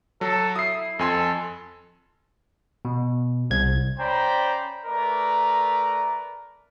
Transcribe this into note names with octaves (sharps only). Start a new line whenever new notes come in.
F#3 A4
E4 D#6 C7
F2 A4 G#5 C6
B2
C2 G#6
C#4 C5 D5 G5 A#5 B5
A3 A#4 B4 D5 A#5